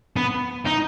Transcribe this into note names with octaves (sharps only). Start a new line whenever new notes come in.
B3
D#4